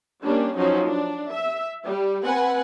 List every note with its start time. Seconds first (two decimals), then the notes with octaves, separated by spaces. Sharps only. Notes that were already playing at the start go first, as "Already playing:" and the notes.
0.24 G3 A#3 C#4 D4
0.58 F3 F#3 C#4 D#4
0.89 D4
1.33 E5
1.84 G3 G4
2.24 C4 B4 F#5 G#5